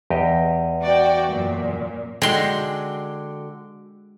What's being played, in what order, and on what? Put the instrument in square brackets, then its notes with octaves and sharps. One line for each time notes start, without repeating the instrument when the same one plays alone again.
[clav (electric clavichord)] E2 G4 D#5
[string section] F#4 D5 G5
F#2 A#2
[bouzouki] D3 [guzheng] G#3 C6 [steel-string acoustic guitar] F#4 G5